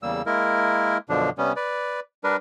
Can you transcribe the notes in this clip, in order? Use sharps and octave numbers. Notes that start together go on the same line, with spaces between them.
E2 C#3 G3 A#3 E6
G#3 A#3 E4 A#4
F#2 B2 D3 F3 D4
C3 G3 B3 C#4
B4 D5
G3 D4 A#4 B4